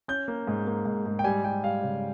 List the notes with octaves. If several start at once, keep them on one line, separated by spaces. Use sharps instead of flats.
C#4 G6
A#3
G#2
A#3
G#2
G#2
G5
G3 G#5
G3 G5
G3 F5
C#3